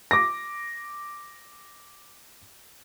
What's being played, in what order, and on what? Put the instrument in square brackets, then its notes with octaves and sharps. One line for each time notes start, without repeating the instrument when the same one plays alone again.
[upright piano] D6 A#6